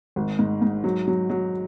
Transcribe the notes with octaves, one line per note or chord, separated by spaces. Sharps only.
G#1
G#2
G#2
F#3
F#3
F#3